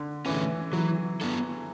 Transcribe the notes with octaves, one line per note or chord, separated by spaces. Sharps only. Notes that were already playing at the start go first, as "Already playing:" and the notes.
Already playing: D3
D3 E3 A3 C#4
E3 F#3
B3 D4 A4